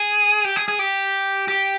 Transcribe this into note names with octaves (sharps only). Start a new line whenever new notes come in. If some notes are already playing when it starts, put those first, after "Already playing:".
Already playing: G#4
G4
G#4
G#4
G4
G4